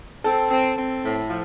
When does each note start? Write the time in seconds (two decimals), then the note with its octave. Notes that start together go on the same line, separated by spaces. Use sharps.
0.24 C4 A4
0.51 C4
0.77 C4
1.03 A2
1.29 F3